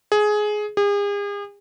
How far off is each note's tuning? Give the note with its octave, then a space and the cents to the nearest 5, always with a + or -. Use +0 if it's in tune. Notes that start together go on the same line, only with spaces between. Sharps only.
G#4 +15
G#4 -40